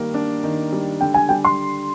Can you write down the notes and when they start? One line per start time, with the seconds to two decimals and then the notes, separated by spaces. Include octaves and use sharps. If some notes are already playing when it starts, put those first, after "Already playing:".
Already playing: D#3 G3 A#3
0.14 D4
0.44 D#3
0.73 G3
1.01 D3 G5
1.14 G#5
1.29 G3 G5
1.45 C6